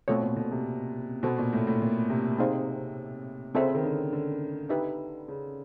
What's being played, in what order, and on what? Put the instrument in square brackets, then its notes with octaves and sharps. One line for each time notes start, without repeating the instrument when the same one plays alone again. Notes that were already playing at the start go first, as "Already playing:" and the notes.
[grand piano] B2 [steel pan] A3 C4 F4 A4 C#5
[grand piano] A#2
B2
C3
[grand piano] B2 [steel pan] F#4 A4 C5
[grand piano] A#2
A2
A2
A#2
C3
[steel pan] C4 D#4 G#4 C5 F5
[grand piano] C#3 [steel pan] C4 F4 A4 C5 E5
[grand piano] D#3
D3
D3
[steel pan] D#4 G4 B4 E5
[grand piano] C#3